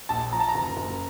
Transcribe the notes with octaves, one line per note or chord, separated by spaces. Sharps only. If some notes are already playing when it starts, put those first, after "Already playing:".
A#1 A5
F3 A#5
A5
A#5
F#1
F#1